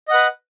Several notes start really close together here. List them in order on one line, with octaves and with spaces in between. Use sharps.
D#5 F#5 B4